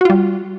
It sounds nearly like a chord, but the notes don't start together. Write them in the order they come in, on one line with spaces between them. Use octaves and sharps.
F#4 F4 G3